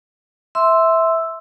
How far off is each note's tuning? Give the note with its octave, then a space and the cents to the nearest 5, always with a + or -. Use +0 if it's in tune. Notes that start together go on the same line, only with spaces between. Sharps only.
E5 -10 C6 +0 E6 +0